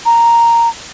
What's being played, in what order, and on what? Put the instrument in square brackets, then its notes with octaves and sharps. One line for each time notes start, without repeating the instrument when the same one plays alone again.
[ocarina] A#5